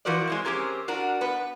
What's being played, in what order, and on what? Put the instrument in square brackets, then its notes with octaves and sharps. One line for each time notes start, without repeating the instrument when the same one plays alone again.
[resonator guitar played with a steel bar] E3 F3 F#4 A#4 B4 D5
G#3 C4 E4
C4 C#4 G4 G#4 A#4
D4 F#4 A#4
B3 B4